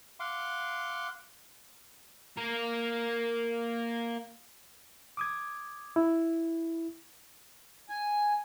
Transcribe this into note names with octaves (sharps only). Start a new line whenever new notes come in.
F5 F#5 C6 D6
A#3 A#4
D6 D#6 G#6
E4
G#5